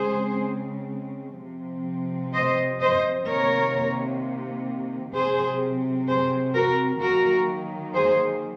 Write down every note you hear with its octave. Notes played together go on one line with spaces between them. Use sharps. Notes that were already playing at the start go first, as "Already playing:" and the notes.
Already playing: C#3 G#3 C4 G#4 C5
C3 F3 C4
C5 D#5
C5 D#5
C3 D#3 A#3 A#4 C#5
C3 F#3 C4 G#4 C5
G#4 C5
F#4 A#4
D#3 F#3 A#3 F#4 A#4
G#4 C5